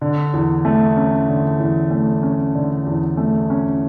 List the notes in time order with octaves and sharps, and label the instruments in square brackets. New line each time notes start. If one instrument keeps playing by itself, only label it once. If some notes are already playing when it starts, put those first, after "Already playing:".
[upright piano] D3
E2
A3
C#4
D3
E2
A3
C#4
D3
E2
A3
C#4